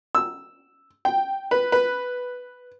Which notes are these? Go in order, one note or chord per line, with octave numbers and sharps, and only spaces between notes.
E6
G5
B4
B4